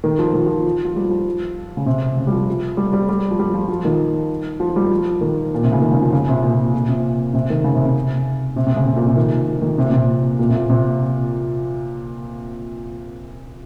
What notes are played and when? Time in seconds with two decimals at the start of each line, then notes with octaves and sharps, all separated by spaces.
0.04 D#3
0.19 F3
0.33 D#3
0.47 F3
0.85 F3
0.96 G3
1.10 F3
1.77 C#3
1.86 C3
2.17 C#3
2.27 G3
2.32 F3
2.77 G3
2.93 G3
3.09 G3
3.31 F3
3.39 G3
3.54 F3
3.69 F3
3.85 D#3
4.60 F3
4.76 G3
4.91 F3
5.21 D#3
5.54 A#2
5.64 C3
5.72 C#3
5.82 D#3
5.92 C#3
6.02 F3
6.12 C#3
6.28 C3
6.43 A#2
6.74 A#2
6.89 C3
7.34 C3
7.50 D#3
7.64 C#3
7.75 C3
7.86 C3
8.56 C3
8.67 C3
8.76 C#3
8.86 C3
8.96 A#2
9.07 C3
9.16 D#3
9.47 F3
9.62 D#3
9.78 C3
9.84 A#2
9.92 C3
10.39 A#2
10.49 C3
10.54 A#2
10.70 C3